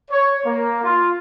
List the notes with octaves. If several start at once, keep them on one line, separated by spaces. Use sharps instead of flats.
C#5
A#3
F4